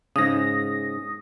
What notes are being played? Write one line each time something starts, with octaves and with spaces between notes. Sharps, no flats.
G#2 C#3 D#6 A#6